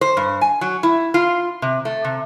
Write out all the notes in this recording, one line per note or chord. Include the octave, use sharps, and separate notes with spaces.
C5
G2
G#5
F#3
E4
F4
C3
A3
C3